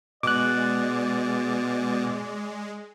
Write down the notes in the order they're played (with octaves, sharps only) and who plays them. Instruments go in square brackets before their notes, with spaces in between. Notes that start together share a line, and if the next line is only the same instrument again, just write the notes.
[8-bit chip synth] B2 [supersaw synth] G#3 [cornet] D5 [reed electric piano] D6 F#6